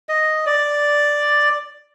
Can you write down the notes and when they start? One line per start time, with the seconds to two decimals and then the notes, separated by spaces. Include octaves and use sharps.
0.09 D#5
0.46 D5